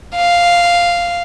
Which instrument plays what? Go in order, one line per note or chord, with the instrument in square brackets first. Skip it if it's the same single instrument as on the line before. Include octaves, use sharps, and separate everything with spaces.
[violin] F5